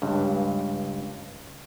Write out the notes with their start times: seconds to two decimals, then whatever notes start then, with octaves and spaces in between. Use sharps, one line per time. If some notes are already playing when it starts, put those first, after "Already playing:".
0.02 C#2 G2